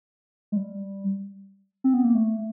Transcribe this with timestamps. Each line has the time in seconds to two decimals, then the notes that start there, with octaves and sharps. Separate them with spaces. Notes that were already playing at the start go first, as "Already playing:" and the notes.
0.52 G#3
0.56 G3
1.84 C4
1.94 B3
2.04 A#3
2.15 A3